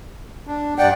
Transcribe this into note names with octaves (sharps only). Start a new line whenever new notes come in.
D4
G2 D5 F#5 G5